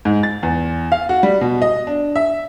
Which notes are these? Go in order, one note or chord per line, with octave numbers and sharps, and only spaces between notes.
G#2
A6
E2
F5
F#4
G3
B2
D#5
D4
E5